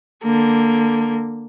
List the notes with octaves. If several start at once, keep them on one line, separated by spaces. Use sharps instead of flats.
D3 A#3